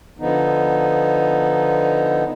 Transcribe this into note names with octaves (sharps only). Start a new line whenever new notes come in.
D3 F3 B3 D#4